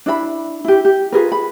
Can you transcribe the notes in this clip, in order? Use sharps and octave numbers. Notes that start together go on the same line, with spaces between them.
D4 E4 D#5 B5
E4 G4
G4
F4 G#4 A#4 B4
B5